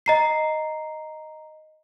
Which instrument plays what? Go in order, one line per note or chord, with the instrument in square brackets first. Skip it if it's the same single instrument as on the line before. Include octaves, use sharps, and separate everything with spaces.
[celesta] D#5 A#5 C7